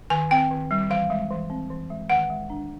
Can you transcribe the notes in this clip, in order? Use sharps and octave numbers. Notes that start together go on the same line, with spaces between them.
D#3 G#5
C4 G5
D#3
G3
E3 F5
G#3
E3
C4
E3
G#3
D#3 F#5
G#3
D4